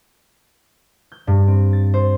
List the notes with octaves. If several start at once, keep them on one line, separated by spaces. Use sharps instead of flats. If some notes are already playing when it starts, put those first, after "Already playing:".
G6
G2
C4
A6
C5